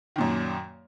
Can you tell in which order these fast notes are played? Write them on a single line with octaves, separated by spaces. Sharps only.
D#3 A#2 F#2